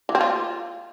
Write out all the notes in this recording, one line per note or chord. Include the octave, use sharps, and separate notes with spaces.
E3
C4
F4